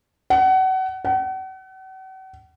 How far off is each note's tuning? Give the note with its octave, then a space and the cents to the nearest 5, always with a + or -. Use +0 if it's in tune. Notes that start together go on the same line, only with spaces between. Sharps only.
F#5 +30
F#5 +40